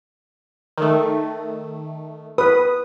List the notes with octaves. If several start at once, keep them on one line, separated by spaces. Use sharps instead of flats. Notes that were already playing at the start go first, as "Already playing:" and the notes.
D#3 A3
B4 D#6